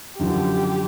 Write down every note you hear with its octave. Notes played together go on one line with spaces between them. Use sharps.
F#2 D3 F3 G4